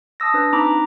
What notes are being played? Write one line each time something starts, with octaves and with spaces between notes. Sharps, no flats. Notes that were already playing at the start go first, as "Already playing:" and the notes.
A5 D#6 E6 A#6
D4 B4
C4 D#4 A#5 B5 D6